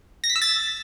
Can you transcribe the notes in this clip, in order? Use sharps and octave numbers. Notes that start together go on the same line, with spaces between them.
A#6
B6
E6
A6